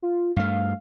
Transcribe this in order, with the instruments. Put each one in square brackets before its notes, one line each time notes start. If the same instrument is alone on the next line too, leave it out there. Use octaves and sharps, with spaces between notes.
[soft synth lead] F4
[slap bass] G2 A3 [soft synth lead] F5